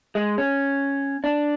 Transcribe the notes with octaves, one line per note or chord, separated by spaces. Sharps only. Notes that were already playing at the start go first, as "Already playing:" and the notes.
G#3
C#4
D4